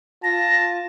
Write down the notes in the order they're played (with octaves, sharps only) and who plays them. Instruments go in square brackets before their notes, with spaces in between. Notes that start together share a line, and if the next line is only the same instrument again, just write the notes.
[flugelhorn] F4 [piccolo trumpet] A5 [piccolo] A#6